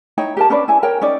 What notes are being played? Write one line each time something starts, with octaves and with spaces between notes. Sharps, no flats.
D#4 E4 C#5 G5
G4 A#4 A5
C#4 D4 B4 D5
E4 G#5
A#4 C#5 G5
C#4 D#4 D5